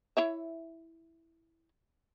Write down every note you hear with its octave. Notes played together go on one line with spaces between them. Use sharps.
E4 C#5 E5